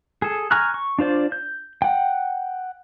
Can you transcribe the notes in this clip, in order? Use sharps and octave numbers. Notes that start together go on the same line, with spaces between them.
G#4 A4
G#5 A#5 C#6 F6 F#6
C#6
D4 F4 C5 D5
G6
F#5 G5